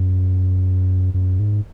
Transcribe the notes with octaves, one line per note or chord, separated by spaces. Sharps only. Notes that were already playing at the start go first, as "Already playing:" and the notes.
Already playing: F#2
F#2
G#2